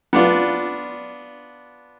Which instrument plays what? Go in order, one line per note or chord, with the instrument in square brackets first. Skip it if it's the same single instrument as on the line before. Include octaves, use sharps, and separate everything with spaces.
[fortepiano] B3 D4 F4